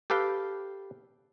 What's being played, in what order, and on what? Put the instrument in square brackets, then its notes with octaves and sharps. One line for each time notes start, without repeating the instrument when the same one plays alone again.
[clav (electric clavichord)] G4 A4 B4 F5 G5